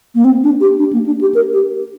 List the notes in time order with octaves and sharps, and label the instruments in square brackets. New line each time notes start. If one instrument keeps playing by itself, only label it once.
[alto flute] A#3
C4
D4
G4
D4
A#3
D4
G4
A#4
G4